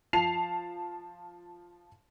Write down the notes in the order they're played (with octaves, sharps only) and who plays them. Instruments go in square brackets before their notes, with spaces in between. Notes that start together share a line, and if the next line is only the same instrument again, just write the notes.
[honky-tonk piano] F3 A5 C7 F7